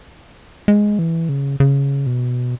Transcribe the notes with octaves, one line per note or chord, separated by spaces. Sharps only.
G#3
E3
C#3
C#3
B2